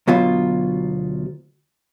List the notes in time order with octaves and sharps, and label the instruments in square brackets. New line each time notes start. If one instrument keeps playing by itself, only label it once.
[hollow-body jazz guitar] D2 B2 F#3 F4